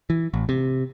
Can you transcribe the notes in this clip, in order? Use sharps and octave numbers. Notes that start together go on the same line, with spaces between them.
E3
A1
C3